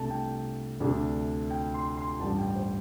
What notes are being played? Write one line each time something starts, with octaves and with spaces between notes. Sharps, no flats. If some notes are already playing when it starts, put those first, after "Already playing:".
Already playing: C2 C3 A3 D4 A5
G5
D2 C3 A3 D4
G5
C6
C6
A1 G2 G3 A5
G5
C5